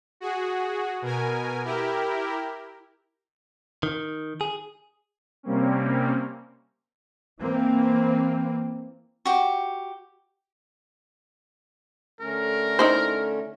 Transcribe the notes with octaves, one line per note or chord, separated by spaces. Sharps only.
F#4 G#4
B2 A#4 G#5
E4 G4 A#4
D#3
G#4
C3 G3 A#3 C4 C#4
E3 A#3 C4
F#4 G4
D3 A3 C#4 A#4
D#4 E4 C5